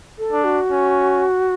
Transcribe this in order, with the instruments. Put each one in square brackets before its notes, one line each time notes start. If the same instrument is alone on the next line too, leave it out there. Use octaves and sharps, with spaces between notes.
[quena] A4
[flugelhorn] D4
[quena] F#4
[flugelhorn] C#4